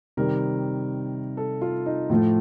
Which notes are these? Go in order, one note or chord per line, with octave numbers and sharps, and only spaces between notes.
C3 D#3 G3 A#4
A4
F4
D#4
A2 F3 A3 F4